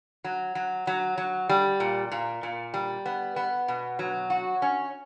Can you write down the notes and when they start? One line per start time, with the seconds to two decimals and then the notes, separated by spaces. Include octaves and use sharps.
0.24 F#3
0.55 F#3
0.87 F#3
1.18 F#3
1.49 G3
1.80 A#2
2.12 A#2
2.43 A#2
2.74 G3
3.06 B3
3.36 B3
3.68 B2
3.99 F#3
4.30 F#4
4.62 C#4